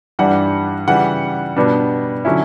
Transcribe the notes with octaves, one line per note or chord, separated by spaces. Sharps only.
G2 E3 G3 D4 F#5
C#3 E3 G3 F#5
B2 G3 B3 D4
D3 F#3 C#4 E4